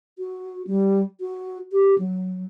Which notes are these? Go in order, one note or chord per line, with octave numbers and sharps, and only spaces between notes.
F#4
G3
F#4
G4
F#3